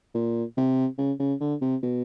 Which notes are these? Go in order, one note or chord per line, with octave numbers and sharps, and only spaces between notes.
A#2
C3
C#3
C#3
D3
C3
B2